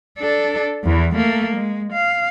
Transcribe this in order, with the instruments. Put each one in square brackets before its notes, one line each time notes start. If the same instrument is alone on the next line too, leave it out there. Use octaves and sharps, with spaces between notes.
[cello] D4 A4
E2 E3
A3 A#3
G#3
F5